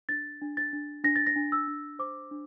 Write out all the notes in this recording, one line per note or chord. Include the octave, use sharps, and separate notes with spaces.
D4 A6
D4
A6
D4
D4 A#6
A6
A#6
D4
E6
D4
C5 D6
D4